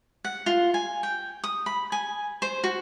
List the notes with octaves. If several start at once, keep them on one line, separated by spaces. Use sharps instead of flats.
F#5
F4
G#5
G5
D#6
B5
G#5
C5
F#4